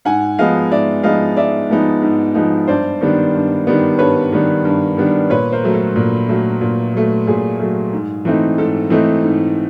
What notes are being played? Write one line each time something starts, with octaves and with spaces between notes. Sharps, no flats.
G#2 F#5 G#5
F3 G#3 B3 D#4 D#5 F5
G#2 D5 E5
F3 G#3 B3 D#4 D#5 F5
G#2 D5 E5
F3 G#3 B3 D#4
G#2
F3 G#3 B3 D#4
G2 C5 D5
D#3 G3 B3 D4
G2
D#3 G3 B3 D4
G2 B4 C#5
D#3 G3 B3 D4
G2
D#3 G3 B3 D4
A#2 B4 C#5
A#4 C5
F#3 A3
A4
A#2
F#3 A3
A#2
F#3 A3
A#2 G#4
F#3 A3
G#2
E3 A3 C4 D#4
G#2 A4
E3 A3 C4 D#4
G#2